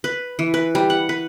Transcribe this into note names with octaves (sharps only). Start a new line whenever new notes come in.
B4
E3
B4
G3
F#5
B4